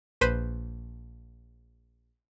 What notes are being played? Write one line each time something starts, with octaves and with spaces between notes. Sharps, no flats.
A#1 B4 C5 B5 D#7